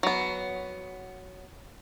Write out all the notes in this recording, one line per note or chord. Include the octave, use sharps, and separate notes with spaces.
F#3 B3